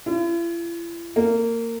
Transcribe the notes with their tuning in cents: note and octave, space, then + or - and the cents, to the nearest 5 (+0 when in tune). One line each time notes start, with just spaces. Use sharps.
E4 +45
A#3 -20